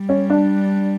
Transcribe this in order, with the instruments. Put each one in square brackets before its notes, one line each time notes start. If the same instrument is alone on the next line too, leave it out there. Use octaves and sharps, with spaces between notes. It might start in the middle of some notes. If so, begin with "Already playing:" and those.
Already playing: [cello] G3
[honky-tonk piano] C#4
D4